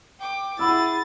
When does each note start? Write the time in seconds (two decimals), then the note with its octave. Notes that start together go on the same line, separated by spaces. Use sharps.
0.19 G5 D6
0.59 E4 G#4 F#5 B5 E6 A6